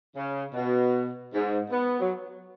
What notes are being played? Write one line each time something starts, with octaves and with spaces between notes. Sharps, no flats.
C#3
B2
G#2
B3
F#3